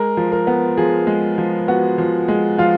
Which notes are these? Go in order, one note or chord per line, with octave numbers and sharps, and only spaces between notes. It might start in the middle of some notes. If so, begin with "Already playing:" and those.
Already playing: G#3 A#4
F3
A#4
B3
F3 G#4
G#3
F3
B3 F#4
F3
G#3
F3 F4